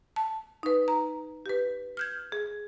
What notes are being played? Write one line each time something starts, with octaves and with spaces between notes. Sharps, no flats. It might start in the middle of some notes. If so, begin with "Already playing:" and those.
A5
D#4 B4
A#5
G4 B4
F6 G6 G#6
G#4